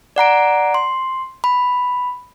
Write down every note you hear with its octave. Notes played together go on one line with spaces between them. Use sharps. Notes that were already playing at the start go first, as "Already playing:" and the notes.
D5 F#5 A#5 D7
C6
B5